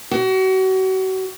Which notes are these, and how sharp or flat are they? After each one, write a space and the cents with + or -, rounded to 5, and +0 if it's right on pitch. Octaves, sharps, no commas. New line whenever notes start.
F#4 +35